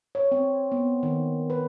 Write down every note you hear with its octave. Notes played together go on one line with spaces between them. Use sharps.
C#5
C4
B3
D#3
B4